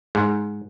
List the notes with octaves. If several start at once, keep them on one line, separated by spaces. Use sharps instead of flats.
G#2